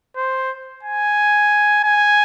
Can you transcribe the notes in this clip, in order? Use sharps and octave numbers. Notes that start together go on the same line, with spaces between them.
C5
G#5
G#5